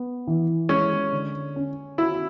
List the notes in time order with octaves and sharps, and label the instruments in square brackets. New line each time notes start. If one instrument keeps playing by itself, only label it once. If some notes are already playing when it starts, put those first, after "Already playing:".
Already playing: [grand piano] B3
E3
[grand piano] G#3 [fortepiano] C#4
[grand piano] D3
C#4
[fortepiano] E4 [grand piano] F#4